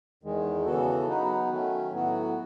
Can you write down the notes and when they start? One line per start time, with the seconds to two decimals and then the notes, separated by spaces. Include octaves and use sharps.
0.23 E2 D#3 G#3
0.65 C#3 E3 B3 F#4 A4
1.07 F#3 B3 D#4 F#4 B4
1.49 D#3 F#3 A3 C#4
1.91 A2 F#3 B3 F#4